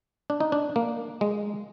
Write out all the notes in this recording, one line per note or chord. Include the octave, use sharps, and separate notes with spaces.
D4
D#4
D4
A#3
G#3